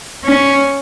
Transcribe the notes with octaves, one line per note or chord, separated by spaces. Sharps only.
C#4